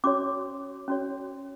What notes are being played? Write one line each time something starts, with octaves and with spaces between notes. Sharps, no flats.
C#4 F#4 C#5 D6
C#4 F#4 C#5